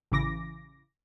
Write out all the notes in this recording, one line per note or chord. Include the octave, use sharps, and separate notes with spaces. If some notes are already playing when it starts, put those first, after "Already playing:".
A1 C#3 E3 D6 A#6